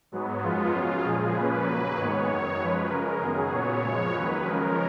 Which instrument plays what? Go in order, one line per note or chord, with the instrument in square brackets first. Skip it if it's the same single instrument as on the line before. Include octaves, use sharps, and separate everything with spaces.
[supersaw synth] G#2 F#3 B3
F#2 F3 G#3 B3 F4
F#2 C#3 F#3
A#2 F3 G#3 G#4
A#2 F3 A#3 C#4 B4
D#2 C#3 F#3 A#3
G#2 D#3 G#3 B3 C#5
F#2 D#3 F#3
F#2 F3 G#3 B4
C#3 G#3 C#4 A#4
F#2 D#3 F#3 B3 G#4
A#2 F#3 B3 C#5
F#2 C#3 F3 G#3
D#2 D#3 F#3 B4
C#3 F3 G#3 C#4 A#4